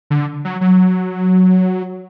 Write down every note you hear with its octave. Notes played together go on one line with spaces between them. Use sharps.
D3
F#3
F#3